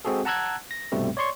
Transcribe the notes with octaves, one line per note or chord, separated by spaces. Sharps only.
G#3 C4 F#4 G#4 A4
F#5 A5 A#5 E6 F#6 G#6
A#6
C2 G2 B2 G3 A3 C4
C#5 D5 C6 C#6